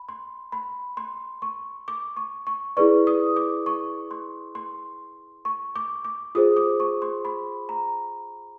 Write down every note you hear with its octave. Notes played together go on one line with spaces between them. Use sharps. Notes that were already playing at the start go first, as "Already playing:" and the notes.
Already playing: B5
C6
B5
C6
C#6
D6
C#6
C#6
E4 G#4 B4 D5 C#6
D#6
D6
C#6
C6
C6
C#6
D6
D6
F4 G#4 C5 D#6
D6
C#6
C6
B5
A#5